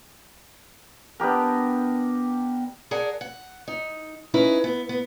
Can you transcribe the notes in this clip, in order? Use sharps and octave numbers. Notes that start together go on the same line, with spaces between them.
B3 D4 G4 A#4
G#4 A#4 D5 F#5 A5
F#5
D#4
C#4 D#4 E4 B4
B3
B3